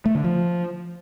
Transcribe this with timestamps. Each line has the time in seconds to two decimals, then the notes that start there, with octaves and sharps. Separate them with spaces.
0.06 A3
0.15 D3
0.24 F3